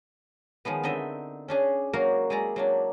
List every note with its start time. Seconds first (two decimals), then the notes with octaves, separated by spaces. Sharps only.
0.65 D#3 F3 G#3 B3
0.83 D3 C4 D#4 D#5 E5
1.48 C#4 D4 G#4
1.93 F#3 A#3 F#4 A#4 F5
2.30 G#3 E4 D5 A#5
2.56 F#3 A#3 D4